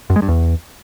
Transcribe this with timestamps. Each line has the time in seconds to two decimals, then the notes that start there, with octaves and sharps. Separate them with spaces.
0.10 F#2
0.16 G#3
0.22 G2
0.28 E2